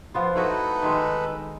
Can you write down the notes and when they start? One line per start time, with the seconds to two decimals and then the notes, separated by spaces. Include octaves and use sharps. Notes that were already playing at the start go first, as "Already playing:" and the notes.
0.14 F3 B3 F4
0.36 A3 D#4 E4 F#4 A4 B4
0.82 D#3 G#3